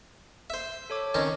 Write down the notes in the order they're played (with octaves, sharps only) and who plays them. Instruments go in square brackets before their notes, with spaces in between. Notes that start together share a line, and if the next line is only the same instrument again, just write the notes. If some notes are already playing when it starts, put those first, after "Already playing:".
[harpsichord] C5 E5
[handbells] A4 C#5 D6
[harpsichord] D#3 C4 C#4